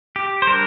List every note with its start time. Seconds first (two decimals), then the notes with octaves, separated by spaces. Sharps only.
0.16 G4
0.42 C5
0.47 G3 D4 A#4